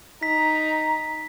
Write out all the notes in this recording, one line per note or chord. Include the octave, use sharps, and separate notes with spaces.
D#4 A#5 B6